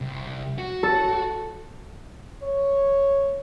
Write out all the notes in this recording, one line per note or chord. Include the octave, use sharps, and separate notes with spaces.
C2
F#4
A4
C#5